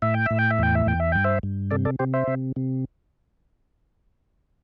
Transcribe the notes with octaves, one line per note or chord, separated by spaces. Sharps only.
A2 E5
G5
A2 E5
G5
E5
E2 G5
E5
E2 G5
E5
G2 G5
C5 E5
G2
C3 A4 D5
A4 D5
C3 G4 C5
C5 E5
C3
C3